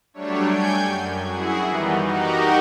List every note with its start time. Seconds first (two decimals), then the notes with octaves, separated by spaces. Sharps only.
0.14 F#3 G3 A3 D4 C#5
0.47 G5 G#5 G6 G#6
0.83 F#2
1.23 E4 F#4 G#4
1.63 D#3 E3 G3 B3 D#4
2.03 D#4 F#4 G4 A#4